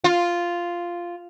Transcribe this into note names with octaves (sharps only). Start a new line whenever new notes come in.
F4